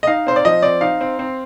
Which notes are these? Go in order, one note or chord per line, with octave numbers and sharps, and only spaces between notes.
D#5
D#4 F5
C4 C5
D5
F3 D#5
C4 D5
D#4 F5
C4
C4